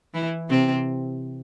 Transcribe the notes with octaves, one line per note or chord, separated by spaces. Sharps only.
E3 E4
C3 C4